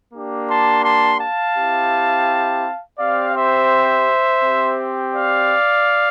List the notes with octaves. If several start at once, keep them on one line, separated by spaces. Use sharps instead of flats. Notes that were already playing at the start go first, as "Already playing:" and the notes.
A#3 D4 G4
A5 C6
A5 C6
F5 A5
C4 E4 G4
C4 G4 D5 F5
C5 E5
C4 G4
D5 F5